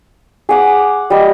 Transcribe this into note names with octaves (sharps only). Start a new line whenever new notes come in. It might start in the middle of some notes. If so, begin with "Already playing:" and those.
G#4 F#5 D6
G3 D#5